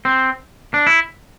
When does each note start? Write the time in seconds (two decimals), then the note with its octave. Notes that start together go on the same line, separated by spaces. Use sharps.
0.05 C4
0.74 D4
0.87 E4